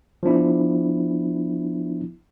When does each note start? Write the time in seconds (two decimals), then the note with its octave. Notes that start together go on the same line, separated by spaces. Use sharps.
0.23 F3 B3 D4 E4